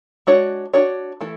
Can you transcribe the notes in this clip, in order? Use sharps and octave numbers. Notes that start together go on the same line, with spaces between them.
G#3 D4 F#4 C#5
D4 F#4 C#5
E3 A3 E4 A4